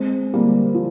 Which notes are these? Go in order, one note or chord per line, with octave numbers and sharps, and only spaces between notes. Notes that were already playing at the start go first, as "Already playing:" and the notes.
Already playing: G#3 C4
G3 A#3
F3